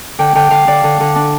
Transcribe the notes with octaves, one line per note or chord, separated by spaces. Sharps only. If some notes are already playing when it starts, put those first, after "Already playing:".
D3 G5
D3 G5
D3 F5
D3 D5
D3
D3
D4